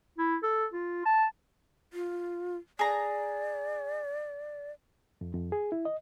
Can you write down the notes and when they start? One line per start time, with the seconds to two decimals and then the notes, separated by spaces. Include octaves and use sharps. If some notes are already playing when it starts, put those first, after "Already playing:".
0.18 E4
0.43 A4
0.73 F4
1.05 A5
1.93 F4
2.79 G#4 D5 A#5
5.21 F2
5.33 F2
5.52 G#4
5.72 E4
5.85 D#5